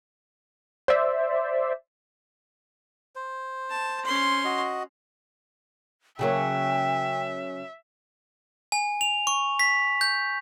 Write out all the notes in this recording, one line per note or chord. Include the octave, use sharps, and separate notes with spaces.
C5 D5 E5
C5
A5
C#4 C6
F#4 D#5
C#3 F#3 A#3 E5 G5
G#5
F7
C#6
B6
G6